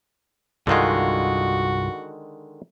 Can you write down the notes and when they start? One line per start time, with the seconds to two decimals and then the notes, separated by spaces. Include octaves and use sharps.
0.67 C2 G2 D3 D#3 G#3 F4 F#4